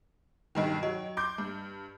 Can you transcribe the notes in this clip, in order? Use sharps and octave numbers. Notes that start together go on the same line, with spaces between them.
B1 G2 D#3 D#5 G5
F#3 D#5
C6 D6 G6 D7
G2